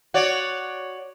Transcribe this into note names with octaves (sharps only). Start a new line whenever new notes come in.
F#4 C#5 D5